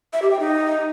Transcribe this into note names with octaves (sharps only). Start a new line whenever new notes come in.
E5
G4
G5
D#4